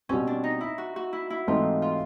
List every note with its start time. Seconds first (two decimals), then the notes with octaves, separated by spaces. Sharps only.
0.09 B2 G3 C4 C#4
0.27 D4
0.44 D#4
0.61 E4
0.78 F#4
0.96 F#4
1.13 E4
1.30 E4
1.47 G#2 E3 A3 C4 D#4 F4
1.82 F4